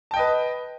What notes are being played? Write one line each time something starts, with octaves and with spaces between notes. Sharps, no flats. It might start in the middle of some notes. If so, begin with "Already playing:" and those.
B4 D#5 G5 A5